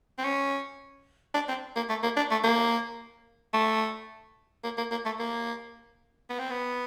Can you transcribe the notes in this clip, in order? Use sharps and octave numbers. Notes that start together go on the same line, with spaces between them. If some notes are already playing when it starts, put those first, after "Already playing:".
C4
C#4
D4
C4
A#3
A3
A#3
D4
A3
A#3
A3
A#3
A#3
A#3
A3
A#3
B3
C4
B3